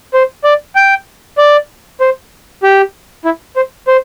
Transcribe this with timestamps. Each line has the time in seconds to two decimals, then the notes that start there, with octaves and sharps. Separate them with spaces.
0.14 C5
0.44 D5
0.76 G5
1.38 D5
2.01 C5
2.63 G4
3.25 E4
3.56 C5
3.88 C5